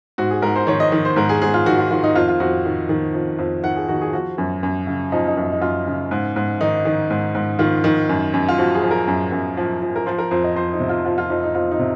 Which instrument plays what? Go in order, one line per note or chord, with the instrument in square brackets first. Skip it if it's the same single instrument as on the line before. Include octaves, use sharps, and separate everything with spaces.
[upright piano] G#2 F#4
G#4
G#2 A#4
C5
D#3 C#5
D#5
D#3
C5
G#2 A#4
G#4
G#2 G#4
F4
D#3 F#4
F4
D#3 F4
D#4
F2 F4
F4
F2 F#4
D#3
D#3
F2
F2
D#3 F#5
G#4
D#3 F#4
G#4
F3 F#4
F#2
F#2
C#3
F3 D#4
D#4
F#2
D#4
F#2 F4
C#3
G#2
G#2
D#3 D#4
D#3
G#2
G#2
D#3 F4
D#3
F#2
F#2
F4
F3 F#4
G#4
F3
A#4
F#2
F#2
F3
F3
A#4
F3 C5
A#4
F2 C5
D#5
F2 C5
D#4
C3
F4
F3 F4
F4
F2 D#4
D#4
F2 F4
D#4
C3